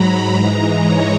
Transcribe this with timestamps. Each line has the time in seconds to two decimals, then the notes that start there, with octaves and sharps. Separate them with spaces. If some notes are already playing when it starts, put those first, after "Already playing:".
Already playing: G#2 F#3 A#5 B5
0.32 G#2 E3 G#3 A#5
0.81 C#5